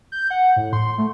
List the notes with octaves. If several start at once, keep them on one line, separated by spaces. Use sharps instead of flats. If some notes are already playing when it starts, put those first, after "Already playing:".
G6
F#5
A2
C6
A3